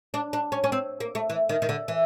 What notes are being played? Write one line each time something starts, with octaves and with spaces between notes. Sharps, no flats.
D4
D4
C#4
C#4
C4
A#3
A3
E3
D#3
D#3
D3
E3